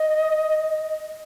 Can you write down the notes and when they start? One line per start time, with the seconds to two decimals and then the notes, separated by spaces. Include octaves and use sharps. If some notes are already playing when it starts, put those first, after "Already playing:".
Already playing: D#5